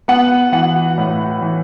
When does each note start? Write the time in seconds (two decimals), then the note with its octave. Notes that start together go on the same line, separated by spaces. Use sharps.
0.08 B3 F#5
0.52 E3 F#5
0.98 A2
1.41 E3